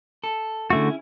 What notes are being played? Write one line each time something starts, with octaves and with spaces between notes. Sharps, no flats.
A4
D3 A3 C#4 E4 F#4 G#4